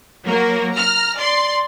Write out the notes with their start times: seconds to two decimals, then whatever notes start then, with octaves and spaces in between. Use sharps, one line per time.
0.25 F#3 A#3 F#4 A#4
0.74 A#5 F6
1.18 D5 C6